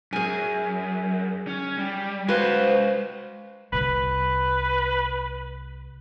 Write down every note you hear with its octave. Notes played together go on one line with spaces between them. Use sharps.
F#2 G#4 G#5
C#4
G3
G#3 F#4 B4 C5 F5
C2 B4